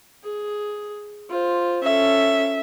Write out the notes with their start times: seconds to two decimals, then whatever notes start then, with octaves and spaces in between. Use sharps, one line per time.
0.24 G#4
1.30 F4 C5
1.83 C#4 A4 E5